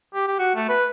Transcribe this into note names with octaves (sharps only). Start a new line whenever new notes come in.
G4
G4
F#4
A3
B4